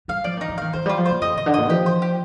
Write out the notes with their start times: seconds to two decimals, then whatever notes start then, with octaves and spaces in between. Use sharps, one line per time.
0.08 G3 F5
0.24 F3 D5
0.37 D#3 D#4
0.49 F3
0.58 D#3 F5
0.73 F3 C5
0.86 G3 F4
0.98 F3
1.06 A#2 C5
1.21 F2 D#5
1.35 C3 D#5
1.46 D3
1.54 A#2 D#5
1.70 F3 G4
1.86 C5
2.02 G4